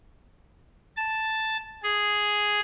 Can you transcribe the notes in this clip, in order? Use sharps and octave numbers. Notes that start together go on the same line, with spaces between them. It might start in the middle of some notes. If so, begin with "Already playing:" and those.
A5
G#4